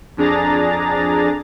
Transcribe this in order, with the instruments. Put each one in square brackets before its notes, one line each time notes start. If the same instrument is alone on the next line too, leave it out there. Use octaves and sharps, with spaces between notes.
[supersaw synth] F2 D4 G#4 A#5 A6